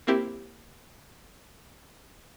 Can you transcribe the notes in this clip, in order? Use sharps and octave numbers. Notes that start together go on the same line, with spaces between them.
A#3 C4 E4 G4